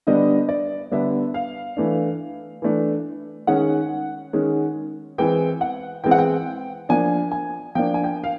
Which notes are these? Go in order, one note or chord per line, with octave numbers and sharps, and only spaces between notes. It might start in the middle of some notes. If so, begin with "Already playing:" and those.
D3 G3 B3 D4 D#5
D5
D3 G3 B3 D4 E5
F5
E3 A3 D4
E3 A3 D4
D#3 G#3 C#4 F#5
D#3 G#3 C#4
E3 G#3 C4 G5
F#5
E3 G#3 C4 G5
F#5
G5
F3 A#3 D4 G#5
G#5
F3 A#3 D4 G5
G#5
G5
F5